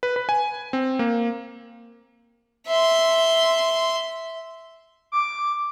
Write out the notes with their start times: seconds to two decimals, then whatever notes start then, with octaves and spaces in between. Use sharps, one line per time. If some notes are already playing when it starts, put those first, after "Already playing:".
0.03 B4
0.16 B4
0.29 G#5
0.73 C4
0.99 A#3
2.68 E5 C6
5.12 D6